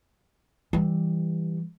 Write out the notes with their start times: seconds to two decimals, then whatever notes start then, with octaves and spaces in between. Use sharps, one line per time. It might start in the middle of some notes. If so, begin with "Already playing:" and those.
0.73 E3 G3